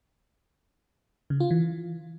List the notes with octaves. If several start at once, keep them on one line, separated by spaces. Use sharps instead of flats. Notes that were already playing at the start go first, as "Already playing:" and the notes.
C#3
F4
E3